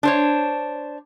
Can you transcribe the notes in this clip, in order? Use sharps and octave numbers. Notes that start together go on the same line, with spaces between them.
D4 C5 C#5